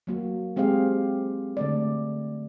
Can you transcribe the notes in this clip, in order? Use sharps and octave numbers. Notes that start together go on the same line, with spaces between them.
F#3 A#3 F#4
G#3 C4 G4 G#4 F5
D3 A3 D5